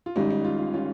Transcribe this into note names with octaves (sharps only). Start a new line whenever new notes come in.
F4
G#1 G#2 G3 C#4 D#4
D#4
F4
F4
G3 C#4 F4